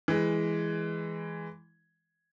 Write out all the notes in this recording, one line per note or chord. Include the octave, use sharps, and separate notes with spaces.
E3 G#3